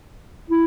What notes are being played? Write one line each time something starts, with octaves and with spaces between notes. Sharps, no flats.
E4